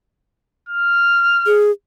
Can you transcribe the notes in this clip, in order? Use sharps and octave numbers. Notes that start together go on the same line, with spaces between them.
F6
G#4